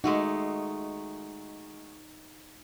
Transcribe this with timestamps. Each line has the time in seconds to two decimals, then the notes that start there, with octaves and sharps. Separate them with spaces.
0.04 G#3 A3 D#4 F#4